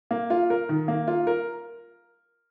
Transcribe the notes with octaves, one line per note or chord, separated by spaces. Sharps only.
A#3
F4
A#4
D#3
A#3
F4
A#4